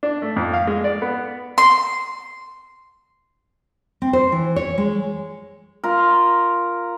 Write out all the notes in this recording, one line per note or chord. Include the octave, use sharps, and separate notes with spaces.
D4
A3
F2
F5
G#3
D5
B3
C6
C4
C5
E3
C#5
G#3
F4 A#4